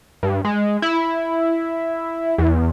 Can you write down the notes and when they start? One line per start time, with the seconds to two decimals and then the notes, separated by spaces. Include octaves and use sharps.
0.23 G2
0.45 G#3
0.82 E4
2.38 E2